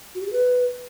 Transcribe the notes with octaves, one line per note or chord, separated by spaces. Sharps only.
F#4
G4
G#4
B4